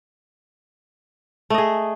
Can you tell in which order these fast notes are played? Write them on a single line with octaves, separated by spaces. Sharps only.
A3 D#5 G#4